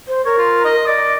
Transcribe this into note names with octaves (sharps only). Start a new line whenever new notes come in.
C5
A#4 C#5
F4
D#5
D5 D#5